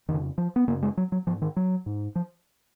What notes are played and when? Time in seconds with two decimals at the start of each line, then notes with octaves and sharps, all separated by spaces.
0.08 F2 D#3
0.13 C#3
0.38 F3
0.56 B3
0.68 F#2 C#3 A#3
0.82 G#3
0.97 F#3
1.12 F#3
1.27 G#2 F3
1.42 D#3
1.57 F#3
1.86 G#2
2.16 F3